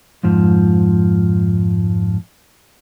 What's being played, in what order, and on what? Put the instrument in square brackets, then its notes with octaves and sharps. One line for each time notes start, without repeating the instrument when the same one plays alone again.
[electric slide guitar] F2 G#2 F3